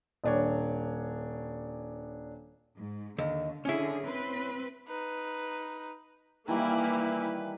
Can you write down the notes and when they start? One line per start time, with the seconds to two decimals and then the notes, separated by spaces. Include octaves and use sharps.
0.24 D#1 D4 C#5
2.76 G#2
3.18 D#2 D3
3.65 D3 C#4 E4 G#4
4.04 C4 B4
4.88 D#4 B4
6.48 D#3 E3 G3 A#3 E4 B4